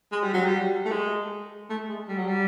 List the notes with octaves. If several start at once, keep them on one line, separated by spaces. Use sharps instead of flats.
G#3
G3
F#3
G3
A3
G#3
A3
G#3
G3
F#3
G3